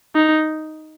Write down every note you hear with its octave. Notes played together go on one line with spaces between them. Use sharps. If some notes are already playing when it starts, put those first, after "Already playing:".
D#4